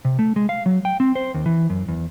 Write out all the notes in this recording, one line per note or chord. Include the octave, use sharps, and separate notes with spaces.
C3
A3
G#3
F5
F#3
G5
C4
C5
D#2
E3
F#2
E2